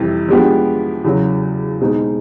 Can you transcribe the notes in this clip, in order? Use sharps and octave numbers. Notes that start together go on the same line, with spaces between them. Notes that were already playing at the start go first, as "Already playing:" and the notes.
Already playing: F2 C3 E3 G3
F3 G#3 B3 D4 G4
E2 C#3 F#3
B2 G#3 C4 D#4